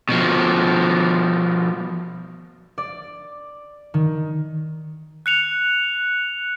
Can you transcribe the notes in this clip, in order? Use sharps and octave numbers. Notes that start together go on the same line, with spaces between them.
B2 F3
D5
D#3
F#6 C#7 F7